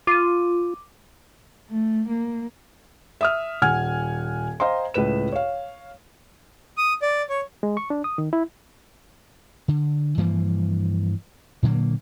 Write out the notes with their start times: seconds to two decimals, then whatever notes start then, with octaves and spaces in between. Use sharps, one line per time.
0.07 F4 D6 D#7
1.70 A3
2.09 A#3
3.21 E5 D#6 F6
3.62 D#1 F#5 G#5 F6 G#6
4.60 C5 D#5 F5 G5 A#5 C6
4.94 C#2 A2 B4 E7
5.32 C#5 F5
6.77 D#6
7.02 D5
7.30 C#5
7.63 G#3
7.77 C#6
7.90 D4
8.04 D#6
8.18 D#3
8.33 E4
9.68 D3
10.17 G2 E3 F3 A#3
11.63 A#2 D3 F#3 A#3